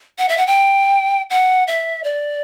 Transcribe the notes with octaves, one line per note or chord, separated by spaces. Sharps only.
F#5
E5
F#5
G5
F#5
E5
D5